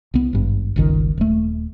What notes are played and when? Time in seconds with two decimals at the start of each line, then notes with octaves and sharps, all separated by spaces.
0.14 C2 B3
0.33 G#1 G2
0.76 G1 C#2 D#3
1.18 D#1 A3